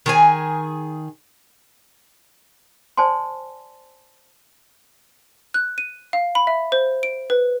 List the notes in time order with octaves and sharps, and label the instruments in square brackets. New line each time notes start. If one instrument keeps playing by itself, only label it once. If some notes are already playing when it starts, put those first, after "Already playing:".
[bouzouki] D#3 G#4 G#5
[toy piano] C5 D5 G#5 A5 C6
[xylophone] F#6
D#7
F5
B5
E5
C5
D7
B4